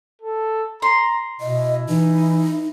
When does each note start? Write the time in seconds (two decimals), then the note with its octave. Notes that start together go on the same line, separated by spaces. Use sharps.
0.22 A4
0.82 A#5 C6
1.41 B2 E4 D#5
1.89 E3 D#4